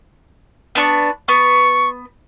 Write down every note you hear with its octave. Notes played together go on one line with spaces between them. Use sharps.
B3 D4 C#6
B3 C#6